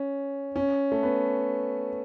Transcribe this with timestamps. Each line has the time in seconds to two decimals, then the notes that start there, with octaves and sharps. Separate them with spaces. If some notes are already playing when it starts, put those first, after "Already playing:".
Already playing: C#4
0.56 C#4
0.92 A3
1.03 B3